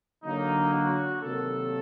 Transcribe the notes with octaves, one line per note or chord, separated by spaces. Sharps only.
D3 F#3 A#3 D#4
F#4
C3 D#3 F#3 A#3 A4